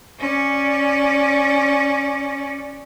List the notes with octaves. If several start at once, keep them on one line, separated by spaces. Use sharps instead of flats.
C#4 D5